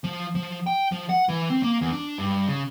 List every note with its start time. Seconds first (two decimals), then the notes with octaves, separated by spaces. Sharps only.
0.04 F3
0.35 F3
0.67 G5
0.92 F3
1.09 F#5
1.29 E3
1.50 C4
1.63 A#3
1.81 E2
1.93 D4
2.18 G2
2.48 C#3